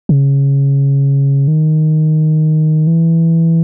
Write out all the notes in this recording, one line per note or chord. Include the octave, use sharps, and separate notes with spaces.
C#3
D#3
E3